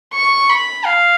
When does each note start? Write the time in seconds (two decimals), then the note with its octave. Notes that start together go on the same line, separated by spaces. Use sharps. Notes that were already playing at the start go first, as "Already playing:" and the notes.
0.14 C#6
0.50 B5
0.85 F5